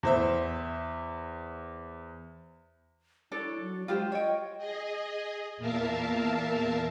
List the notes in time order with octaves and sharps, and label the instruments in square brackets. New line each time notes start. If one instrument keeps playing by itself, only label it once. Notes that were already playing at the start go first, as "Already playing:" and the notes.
[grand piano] E2 C5 E5
[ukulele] D4 A4 C#5 [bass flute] E4
[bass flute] F#3
[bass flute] G#3 [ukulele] F4 G4 C5
[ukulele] C#5 G5 [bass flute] D#5
[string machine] G#4 D#5
E2 A#2 A#4 E5 F5 A5